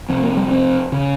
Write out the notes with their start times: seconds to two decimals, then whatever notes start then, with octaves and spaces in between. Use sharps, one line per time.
0.09 F2 C3 C4
0.23 A#3
0.37 G3
0.51 C4
0.92 C#3